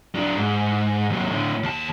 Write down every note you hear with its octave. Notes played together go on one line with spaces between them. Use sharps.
F#3 D4
G#2
D#2 F#3
A2 D3
D#2 A5